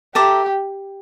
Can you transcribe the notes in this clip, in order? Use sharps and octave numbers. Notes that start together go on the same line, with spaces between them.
G4 A4 E5 A#5 D6